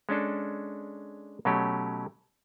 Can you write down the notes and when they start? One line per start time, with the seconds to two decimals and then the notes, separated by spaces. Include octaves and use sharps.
0.09 G#3 C#4 D4 A4
1.45 B2 F#3 A3 C#4 G4